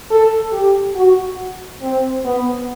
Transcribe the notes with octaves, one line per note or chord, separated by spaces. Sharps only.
A4
G4
F#4
C4
B3